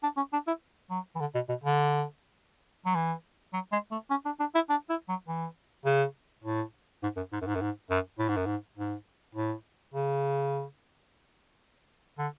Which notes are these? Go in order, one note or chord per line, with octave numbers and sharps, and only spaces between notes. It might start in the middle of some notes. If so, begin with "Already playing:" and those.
D4
C#4
D4
E4
F#3
E3
D3
B2
B2
D3
F#3
E3
F#3
G#3
A3
C#4
D4
D4
E4
D4
E4
F#3
E3
C#3
A2
G#2
F#2
G#2
F#2
G#2
F#2
G#2
F#2
A2
G#2
F#2
G#2
G#2
A2
C#3
D3